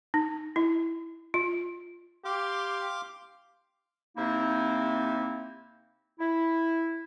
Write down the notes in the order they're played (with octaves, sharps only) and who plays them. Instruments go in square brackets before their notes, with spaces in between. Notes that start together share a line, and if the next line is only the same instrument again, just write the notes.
[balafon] D#4
E4
F4
[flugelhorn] G4 [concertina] F5 C6 D6
[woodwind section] C3 A#3 C4 D#4 E4
E4